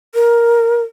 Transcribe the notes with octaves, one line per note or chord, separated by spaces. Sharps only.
A#4